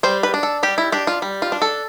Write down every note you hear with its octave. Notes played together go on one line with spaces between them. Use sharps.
G3 C5
B4
D4
A4
G3 G4
E4
D4 G4
F4
G3
F4
D4
A4